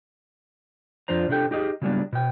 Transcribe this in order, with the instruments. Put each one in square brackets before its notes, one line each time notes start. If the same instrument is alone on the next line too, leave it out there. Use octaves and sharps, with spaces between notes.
[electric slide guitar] F2 F3 D4 C5 A#5
C3 D4 G4 A4 G5
D#4 G4 G#4 D#5
C#3 F#3 G3 A#3 B3 D4
B2 G5